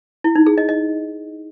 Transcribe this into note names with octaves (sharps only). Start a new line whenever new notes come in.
E4
D#4
G#4
D#5
D#5